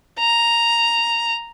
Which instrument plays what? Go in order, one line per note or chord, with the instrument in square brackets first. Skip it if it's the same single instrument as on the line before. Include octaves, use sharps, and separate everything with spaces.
[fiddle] A#5